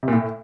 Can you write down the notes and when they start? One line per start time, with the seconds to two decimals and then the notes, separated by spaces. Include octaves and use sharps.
0.03 C3
0.08 A#2
0.13 A2